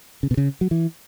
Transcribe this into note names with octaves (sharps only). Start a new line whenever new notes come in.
C#3
B2
C#3
F#3
E3